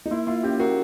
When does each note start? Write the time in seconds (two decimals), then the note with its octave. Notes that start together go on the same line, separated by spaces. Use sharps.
0.06 D#4
0.11 A#3 E4
0.27 A#3 F4
0.43 C#4 G4
0.60 F#4 A#4